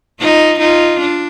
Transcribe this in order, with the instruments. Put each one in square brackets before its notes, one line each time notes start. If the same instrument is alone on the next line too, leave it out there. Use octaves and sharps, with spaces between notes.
[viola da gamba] D#4 F4
D#4 F4
D4